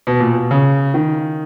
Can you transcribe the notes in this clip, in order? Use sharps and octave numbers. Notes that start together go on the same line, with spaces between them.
B2
A#2
B2
C#3
D#3